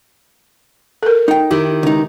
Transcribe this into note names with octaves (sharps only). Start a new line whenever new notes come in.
A4 A#4
D#4 G5
D#3 E4 G4
C#2 D#4